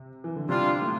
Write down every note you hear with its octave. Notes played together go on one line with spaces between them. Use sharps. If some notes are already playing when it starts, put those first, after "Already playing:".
Already playing: C3
E3
D3
C3 G3 D4 F4
A2